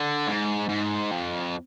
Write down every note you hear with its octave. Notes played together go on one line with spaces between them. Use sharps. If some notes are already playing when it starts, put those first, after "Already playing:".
Already playing: D3
G#2
G#2
F2